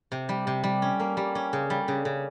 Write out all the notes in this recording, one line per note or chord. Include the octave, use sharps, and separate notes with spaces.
C3
G3
C3
G3
C#4
A#3
G3
C#4
C#3
G3
C#3
C#3